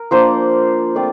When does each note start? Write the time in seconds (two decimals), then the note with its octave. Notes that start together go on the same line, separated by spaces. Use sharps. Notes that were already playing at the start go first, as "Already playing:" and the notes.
Already playing: A#4
0.11 F3 A#3 D4 C5
0.95 A3 C4 F4 D5